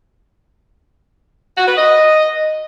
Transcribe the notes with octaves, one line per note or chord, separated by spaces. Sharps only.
F#4
B4
D#5